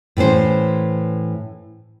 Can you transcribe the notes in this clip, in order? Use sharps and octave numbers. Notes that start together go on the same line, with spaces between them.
A2 E3 C#4 C5